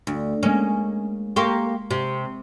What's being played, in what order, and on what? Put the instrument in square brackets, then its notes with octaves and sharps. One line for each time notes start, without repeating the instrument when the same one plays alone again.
[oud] D2
[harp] G#3 A#3 [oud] C#4
[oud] A#3 G4 [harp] C6 C#6
[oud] C3